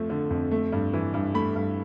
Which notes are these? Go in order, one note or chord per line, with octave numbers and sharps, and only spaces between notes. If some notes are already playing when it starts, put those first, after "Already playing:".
Already playing: F2 F3 A3
D3
F2
A3
G2
E3
G2
A3 B5
G2